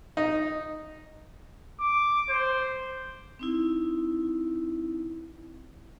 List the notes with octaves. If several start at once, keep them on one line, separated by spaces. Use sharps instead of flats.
D#4
D6
C5
C4 D#4 E4